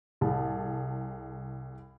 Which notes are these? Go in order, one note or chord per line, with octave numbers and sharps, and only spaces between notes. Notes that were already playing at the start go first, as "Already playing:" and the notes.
C2 G#4 A5